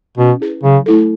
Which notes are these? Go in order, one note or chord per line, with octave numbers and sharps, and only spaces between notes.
B2 C#4
E4 G#4 B4
C#3 F#3
A3 E4 A4